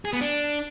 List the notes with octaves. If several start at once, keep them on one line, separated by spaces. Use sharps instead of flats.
G#4
B3
D4